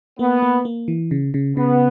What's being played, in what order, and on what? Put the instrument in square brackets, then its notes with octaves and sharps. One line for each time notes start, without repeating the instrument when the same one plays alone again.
[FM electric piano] A#3 [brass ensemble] B3
[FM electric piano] A#3
A#3
E3
C#3
C#3
[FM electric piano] C#3 [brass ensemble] B3